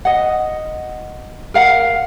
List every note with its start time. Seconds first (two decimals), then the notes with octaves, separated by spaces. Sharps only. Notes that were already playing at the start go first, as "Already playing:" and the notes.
0.05 D#5 F#5
1.54 A#4 F5 F#5